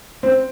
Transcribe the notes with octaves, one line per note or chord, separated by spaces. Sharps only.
C4